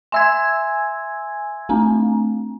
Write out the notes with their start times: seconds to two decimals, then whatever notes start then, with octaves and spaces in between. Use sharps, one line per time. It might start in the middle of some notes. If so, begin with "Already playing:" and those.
0.12 E5 G#5 C6 E6 G#6
1.69 A3 C4 D4